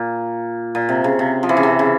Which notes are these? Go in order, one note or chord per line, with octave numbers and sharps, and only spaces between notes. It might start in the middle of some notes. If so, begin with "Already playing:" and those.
Already playing: A#2
A#2
C3
C#3
C3
F3
E3
C#3
C3
C#3